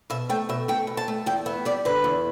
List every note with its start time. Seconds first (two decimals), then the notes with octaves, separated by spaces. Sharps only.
0.10 B2 E5
0.29 A3 G5
0.49 B2 E5
0.68 A3 G5
0.87 B2
0.97 A5
1.08 A3
1.26 E2 G5
1.46 B3 E5
1.65 G3 D5
1.85 D3 B4
2.04 E2